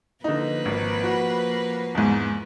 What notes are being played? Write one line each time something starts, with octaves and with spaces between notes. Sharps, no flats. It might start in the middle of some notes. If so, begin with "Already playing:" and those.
D3 F3 A#3 D#4 B4
G#1
F#4
E2 G#2